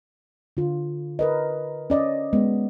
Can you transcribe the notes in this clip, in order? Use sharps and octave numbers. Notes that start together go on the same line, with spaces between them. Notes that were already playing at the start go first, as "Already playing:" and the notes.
D3 F4
A#4 B4 D#5
C#4 D5 D#5
G#3 B3